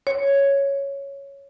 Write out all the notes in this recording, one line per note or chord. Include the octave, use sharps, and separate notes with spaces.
C#5